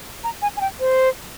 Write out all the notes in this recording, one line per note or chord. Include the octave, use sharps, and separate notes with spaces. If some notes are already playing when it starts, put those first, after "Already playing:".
A#5
G#5
G#5
G5
C5